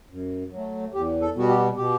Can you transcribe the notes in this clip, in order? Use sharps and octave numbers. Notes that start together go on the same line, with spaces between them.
F#2
F#3 A3
E2 G4
A4
B2 G3 B3 F#4
G4
B2 G4